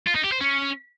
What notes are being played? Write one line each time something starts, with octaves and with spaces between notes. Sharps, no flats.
F4
D#4
G4
C5
C#4